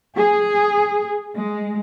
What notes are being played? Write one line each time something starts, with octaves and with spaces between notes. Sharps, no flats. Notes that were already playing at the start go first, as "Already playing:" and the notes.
G#4
G#3